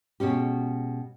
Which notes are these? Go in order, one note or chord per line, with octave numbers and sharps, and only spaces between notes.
B2 G#3 C#4 G4